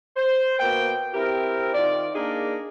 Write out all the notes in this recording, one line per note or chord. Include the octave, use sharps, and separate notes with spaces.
C5
B2 A#3 G5
C4 E4 G4 A#4
D#3 F4 D5
A#3 D4 D#4 G#4 A#4